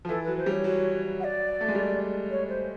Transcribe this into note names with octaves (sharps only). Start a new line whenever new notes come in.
F3
E3 A4
F#3 B4
C5
G3 C#5
F#3
F#5
D5
A3
G#3
G3
C#5
C5